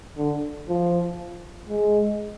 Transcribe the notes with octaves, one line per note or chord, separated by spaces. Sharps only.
D3
F3
G#3